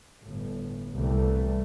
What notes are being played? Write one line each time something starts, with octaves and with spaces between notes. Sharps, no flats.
G1 A2
C2 E3 G3 A3